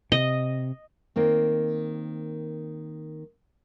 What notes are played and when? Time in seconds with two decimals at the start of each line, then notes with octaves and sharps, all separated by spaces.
0.12 C3 D#5
1.16 D#3 A#3 C4